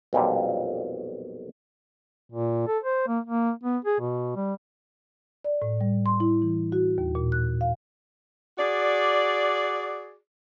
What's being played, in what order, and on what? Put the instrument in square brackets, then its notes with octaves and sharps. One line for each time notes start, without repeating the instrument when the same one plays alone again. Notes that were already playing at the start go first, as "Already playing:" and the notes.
[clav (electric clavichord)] B1 F2 A#2 G3
[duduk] A#2
A4
C5
A#3
A#3
B3
G#4
B2
G3
[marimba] D5
A2
G3
C6
E4
E3
F#4
D#2
A#2
F#6
F5
[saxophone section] F#4 G#4 D5